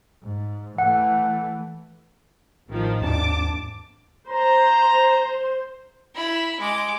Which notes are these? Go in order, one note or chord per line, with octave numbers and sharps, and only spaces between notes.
G#2
E3 A3 F#5
A1 D#3 F3
D#2 G#2 D4 A5 D6
C5 A#5
E4 B5
G#3 D6